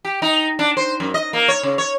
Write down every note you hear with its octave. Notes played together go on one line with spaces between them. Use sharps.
G4
D#4
D4
C5
F#2
D#5
A#3
C#5
C#3
C#5